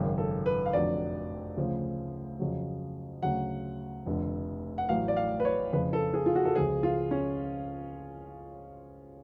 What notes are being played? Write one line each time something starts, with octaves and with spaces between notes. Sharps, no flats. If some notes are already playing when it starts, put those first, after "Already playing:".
Already playing: G#1 F#2 C#3
A4
B4
F5
F1 F2 D3 F#3 D5
D2 C#3 F3
F2 C#3 F#3
D2 C#3 F#3 F#5
F1 F2 D3
F#5
A1 A2 F#3 F5
D5
F5
B4
C#5
F2 C#3 F3 B4
A4
G#4
F4
F#4
A4
C#2 C#3 F3 G#4
F4
C#4